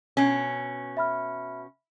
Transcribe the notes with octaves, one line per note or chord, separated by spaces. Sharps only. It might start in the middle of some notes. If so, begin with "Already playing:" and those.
B2 C#4 G#5
E5 B5 F6